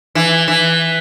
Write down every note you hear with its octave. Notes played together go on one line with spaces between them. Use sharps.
E3
E3